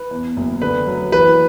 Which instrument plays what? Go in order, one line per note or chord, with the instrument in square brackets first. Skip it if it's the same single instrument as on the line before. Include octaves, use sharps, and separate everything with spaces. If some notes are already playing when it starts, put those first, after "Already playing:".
Already playing: [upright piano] B4
E2
F#1
[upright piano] D3 [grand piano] B4
[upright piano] F#3
[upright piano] E3 [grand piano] B4